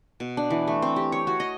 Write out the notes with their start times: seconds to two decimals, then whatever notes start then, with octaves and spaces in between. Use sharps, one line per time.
0.20 B2
0.37 D4
0.50 E3
0.67 A3
0.82 C4
0.96 G4
1.12 C#5
1.27 F#4
1.40 D#5